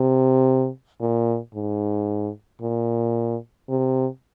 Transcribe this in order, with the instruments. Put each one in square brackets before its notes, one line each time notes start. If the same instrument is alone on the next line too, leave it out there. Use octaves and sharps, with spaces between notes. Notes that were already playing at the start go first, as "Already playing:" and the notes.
Already playing: [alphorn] C3
A#2
G#2
A#2
C3